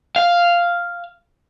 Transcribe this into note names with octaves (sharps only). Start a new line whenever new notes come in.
F5